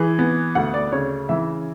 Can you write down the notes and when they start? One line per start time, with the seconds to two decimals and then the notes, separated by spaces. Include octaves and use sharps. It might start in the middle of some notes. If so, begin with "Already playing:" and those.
Already playing: E3 G#4
0.19 B3
0.55 D2 F#5
0.74 D5
0.92 C#3 C#5
1.29 E3 E5